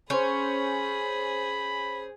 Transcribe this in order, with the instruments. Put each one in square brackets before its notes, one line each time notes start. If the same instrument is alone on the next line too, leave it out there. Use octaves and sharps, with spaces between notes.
[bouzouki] C#4 [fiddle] G#4 [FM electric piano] C5 G6 [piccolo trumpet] B5